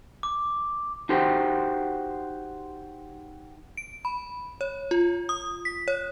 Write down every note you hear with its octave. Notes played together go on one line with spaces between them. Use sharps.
D6
D#4 F#4 G4 C5
D7
B5
C#5
F4
D#6
B6
C#5